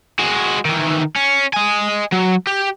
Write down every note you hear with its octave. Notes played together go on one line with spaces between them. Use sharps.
G#3 F#4
D#3 E3
C#4
D#5 G#5
F#3
G4